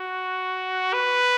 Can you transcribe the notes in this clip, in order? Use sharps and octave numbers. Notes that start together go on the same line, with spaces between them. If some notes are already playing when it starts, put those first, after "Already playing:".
Already playing: F#4
B4